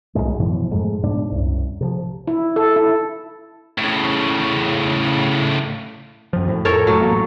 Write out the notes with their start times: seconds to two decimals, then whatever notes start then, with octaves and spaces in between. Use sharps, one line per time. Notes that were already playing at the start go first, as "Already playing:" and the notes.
0.15 B1 F2 A2 G#3
0.39 F#2 B2 E3 F3
0.71 F2 G#2 G#3 A3
1.03 G#2 B2 D4
1.32 C2 F#2
1.81 C3 E3 F3
2.27 E4
2.56 A4
2.76 E4
3.78 A2 C#3
6.33 F#2 F3
6.48 A2
6.65 F2 A4 A#4 C#5
6.87 A2 F#3 A3
7.02 A1 A#3